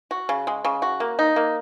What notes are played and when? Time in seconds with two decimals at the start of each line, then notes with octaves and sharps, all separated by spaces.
0.11 F#4
0.29 C#3
0.47 G#3
0.65 C#3
0.82 F#4
1.00 A#3
1.19 D#4
1.36 A#3